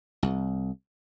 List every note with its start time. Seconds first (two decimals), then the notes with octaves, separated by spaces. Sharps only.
0.23 C2